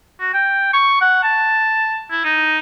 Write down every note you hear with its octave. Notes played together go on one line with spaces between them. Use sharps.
F#4
G5
C#6
F#5
A5
E4
D#4